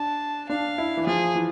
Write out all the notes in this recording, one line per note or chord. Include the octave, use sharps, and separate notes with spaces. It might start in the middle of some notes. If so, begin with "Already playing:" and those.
Already playing: D4 A5
D4 F5
E4
E3
F3 G#4
E3